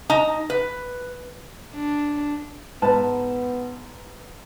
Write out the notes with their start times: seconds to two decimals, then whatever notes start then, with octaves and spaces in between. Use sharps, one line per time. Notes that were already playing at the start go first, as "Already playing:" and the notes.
0.10 D#4 A#5
0.50 B4
1.74 D4
2.82 G#2 B3 B4 A5